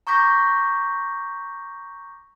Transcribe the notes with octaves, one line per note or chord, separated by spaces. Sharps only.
A#5 C#6 D6 G6 A#6 B6